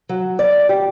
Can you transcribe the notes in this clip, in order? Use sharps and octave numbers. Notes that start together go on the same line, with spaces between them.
F#3
D5
G4